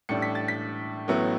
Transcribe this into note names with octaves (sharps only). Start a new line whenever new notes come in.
A1 A2 G3 D4 C#7
B6
A6
B6
A1 A2 F#3 B3 E4